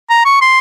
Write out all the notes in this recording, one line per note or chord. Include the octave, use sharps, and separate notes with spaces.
A#5
C#6
C6